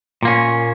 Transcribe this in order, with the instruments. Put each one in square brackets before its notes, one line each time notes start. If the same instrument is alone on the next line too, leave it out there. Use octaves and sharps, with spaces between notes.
[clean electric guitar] A#2 A#3 C#4